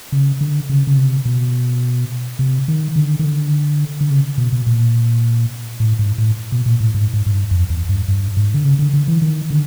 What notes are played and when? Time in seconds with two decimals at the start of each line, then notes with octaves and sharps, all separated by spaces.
0.12 C#3
0.41 D3
0.69 C#3
0.87 C#3
0.97 C3
1.25 B2
2.39 C3
2.68 D#3
2.96 D3
3.19 D#3
3.25 D3
4.01 D3
4.10 C#3
4.38 B2
4.52 B2
4.66 A#2
5.80 A2
5.99 G#2
6.18 A2
6.52 B2
6.66 A#2
6.80 A2
6.94 G#2
7.13 G#2
7.26 G#2
7.31 G2
7.51 F2
7.70 E2
7.89 G2
8.08 G2
8.37 G#2
8.54 D3
8.64 C#3
8.79 D3
8.93 D3
9.08 E3
9.22 D#3
9.50 D3